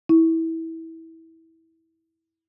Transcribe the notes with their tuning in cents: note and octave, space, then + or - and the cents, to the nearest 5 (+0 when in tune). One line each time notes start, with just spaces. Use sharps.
E4 -20